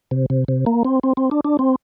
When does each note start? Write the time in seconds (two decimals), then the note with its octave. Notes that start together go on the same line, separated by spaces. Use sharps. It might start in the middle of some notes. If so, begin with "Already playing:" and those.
0.11 C3
0.30 C3
0.48 C3
0.66 A#3
0.85 C4
1.03 C4
1.17 C4
1.31 D4
1.45 D4
1.59 C4